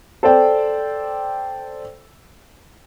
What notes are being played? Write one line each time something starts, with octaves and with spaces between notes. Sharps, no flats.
A4 C5 D5 G5